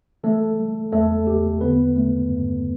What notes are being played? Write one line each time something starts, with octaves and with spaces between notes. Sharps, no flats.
E3 A3 A4
G3
E2 A3 A4
E2 G4
D3 B3 B4
A3
G2